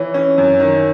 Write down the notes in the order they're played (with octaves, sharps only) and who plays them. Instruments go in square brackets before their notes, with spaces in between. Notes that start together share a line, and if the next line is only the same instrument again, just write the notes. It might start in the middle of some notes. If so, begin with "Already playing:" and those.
Already playing: [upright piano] E3 [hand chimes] C#5
[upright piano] C#4
F#2
D#3